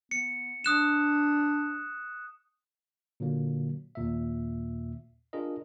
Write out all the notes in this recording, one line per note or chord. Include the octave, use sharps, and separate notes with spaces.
B3 C#7
D4 D#6 F#6 E7
A#2 D3 F#3 A#3
D#2 A#2 E5
D4 F4 G#4 A#4 D#5